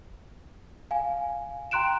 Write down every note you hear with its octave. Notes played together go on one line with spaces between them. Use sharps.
F5 G#5
G5 A#5 C6 F#6 D7 E7